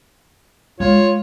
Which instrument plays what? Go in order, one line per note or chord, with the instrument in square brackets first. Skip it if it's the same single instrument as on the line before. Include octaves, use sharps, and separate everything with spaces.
[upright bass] G#3 [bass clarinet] F4 [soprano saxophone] C#5